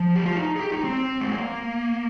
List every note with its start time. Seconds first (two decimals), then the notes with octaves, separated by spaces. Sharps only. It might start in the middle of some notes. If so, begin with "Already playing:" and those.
Already playing: F3
0.15 G4
0.26 F4
0.36 D#4
0.56 G#4
0.60 G4
0.72 D#4
0.84 C4
1.21 G#3
1.31 A#3